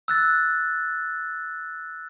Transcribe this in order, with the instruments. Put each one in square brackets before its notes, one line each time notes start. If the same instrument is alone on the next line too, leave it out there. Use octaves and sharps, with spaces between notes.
[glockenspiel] E6 F#6 A6